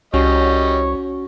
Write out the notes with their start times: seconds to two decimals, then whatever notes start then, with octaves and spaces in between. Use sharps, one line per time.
0.14 C2 G3 C#4 F#4 C#5 D#5